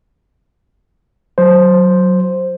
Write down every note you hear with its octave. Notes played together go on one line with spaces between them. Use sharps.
F#3 C5